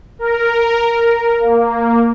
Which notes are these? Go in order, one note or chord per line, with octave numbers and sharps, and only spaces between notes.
A#4
A#3